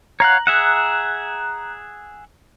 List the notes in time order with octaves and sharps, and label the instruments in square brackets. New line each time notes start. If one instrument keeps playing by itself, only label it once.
[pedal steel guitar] C#5 F5 F#5 [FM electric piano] A#5 F#6
[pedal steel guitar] G#4 E5 F#5